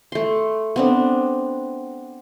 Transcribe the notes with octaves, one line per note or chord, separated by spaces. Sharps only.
A3 C6
B3 C4 D4